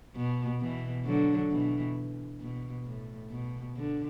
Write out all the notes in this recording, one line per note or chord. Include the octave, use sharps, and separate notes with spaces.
B2
B2 E3
D3 F#3
B2 E3
B2
A2
B2
D3